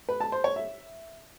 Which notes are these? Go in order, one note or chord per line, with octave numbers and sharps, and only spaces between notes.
B4
A5
C5
C#5
E5